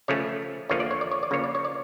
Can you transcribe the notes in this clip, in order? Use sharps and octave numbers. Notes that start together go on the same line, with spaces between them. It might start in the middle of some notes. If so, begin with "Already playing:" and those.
C#3 F3 A3 C#4 C#5
E2 D3 F3 A#3 C#5
D5
C#5
D5
C#5
D5
C#3 F3 A#3 C#5
D5
C#5
D5